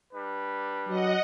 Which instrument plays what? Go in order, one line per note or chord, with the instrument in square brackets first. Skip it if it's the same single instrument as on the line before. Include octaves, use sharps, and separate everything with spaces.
[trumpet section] G3 D4 B4
[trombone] F#3 [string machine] D#5 F#5